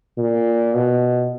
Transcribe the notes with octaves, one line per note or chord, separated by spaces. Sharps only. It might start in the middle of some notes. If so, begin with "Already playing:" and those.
A#2
B2